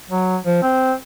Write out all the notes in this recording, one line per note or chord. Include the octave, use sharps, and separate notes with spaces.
F#3
F3
C4